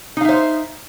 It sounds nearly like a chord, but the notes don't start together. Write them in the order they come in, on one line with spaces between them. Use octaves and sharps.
D#4 F5 E5 C5